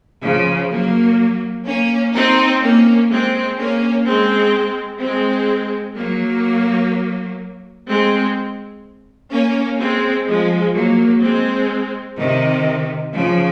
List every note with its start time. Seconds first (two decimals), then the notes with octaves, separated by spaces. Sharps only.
0.23 C#3 F3
0.71 F#3 A#3
1.67 A#3 C#4
2.14 C4 D#4
2.62 A#3 C#4
3.10 G#3 C4
3.58 A#3 C#4
4.05 G#3 C4
5.01 G#3 C4
5.96 F#3 A#3
7.88 G#3 C4
9.31 A#3 C#4
9.79 G#3 C4
10.27 F3 G#3
10.75 F#3 A#3
11.22 G#3 C4
12.19 C3 D#3
13.14 C#3 F3